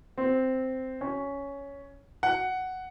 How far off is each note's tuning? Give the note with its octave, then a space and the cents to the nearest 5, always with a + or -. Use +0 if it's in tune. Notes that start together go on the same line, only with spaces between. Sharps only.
C4 -5
C#4 +10
F#5 +5